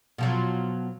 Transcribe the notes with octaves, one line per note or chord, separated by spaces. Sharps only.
B2 F3 F#3